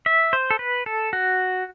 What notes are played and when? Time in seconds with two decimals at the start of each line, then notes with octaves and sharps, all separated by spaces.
0.06 E5
0.33 C5
0.51 A4
0.59 B4
0.86 A4
1.13 F#4